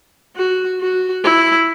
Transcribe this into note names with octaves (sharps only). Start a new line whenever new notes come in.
F#4
F#4
E4